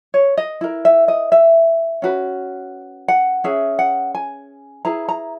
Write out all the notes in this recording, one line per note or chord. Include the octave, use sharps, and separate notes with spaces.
C#5
D#5
E4 A#4
E5
D#5
E5
C#4 F#4 B4
F#5
C#4 G#4 B4 E5
F#5
G#5
E4 G#4 B4 A#5
A#5